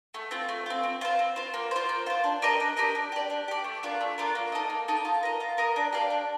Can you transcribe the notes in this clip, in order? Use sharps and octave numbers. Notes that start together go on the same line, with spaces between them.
A3
C4 F4
A3
C4 F4
C4
F4 C5
C4
F4 C5
A#3
F4 C5
A#3
F4 C5
D4
G4 A#4 D#5
D4
G4 A#4 D#5
D4
G4 D5
D4
G4 D5
A3
D4 F4 A#4
A3
D4 F4 A#4
A#3
D#4 A4 D#5
A#3
D#4 A4 D#5
F4
A#4 D#5
F4
A#4 D#5
D4
G4 D5 F5
D4